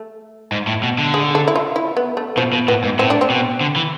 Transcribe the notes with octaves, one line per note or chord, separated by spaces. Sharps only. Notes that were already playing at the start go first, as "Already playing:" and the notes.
Already playing: A3
G#2
A2
B2
D3
G#4
A4
E4
F4
E4
B3
A3
B2 F3
B2
A2 B3
G#2
A2 C4
D4
C4
B2
D3
E3